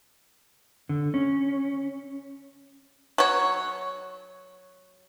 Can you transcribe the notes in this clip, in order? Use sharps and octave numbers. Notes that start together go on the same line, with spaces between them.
D3
C#4
F#3 C#5